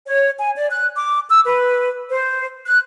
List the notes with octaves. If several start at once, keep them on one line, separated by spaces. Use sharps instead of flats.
C#5
G#5
D5
F#6
D6
E6
B4
C5
F#6